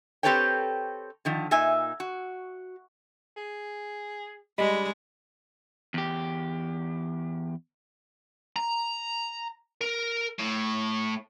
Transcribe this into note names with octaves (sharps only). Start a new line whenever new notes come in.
C4 G4 A4 B4 C#5 G5
D3 D#3 F3
A#2 D#4 E5 G#5
F#4
G#4
G3 G#3 D4 D#5 B5
E2 G4
A#5
A#4
A2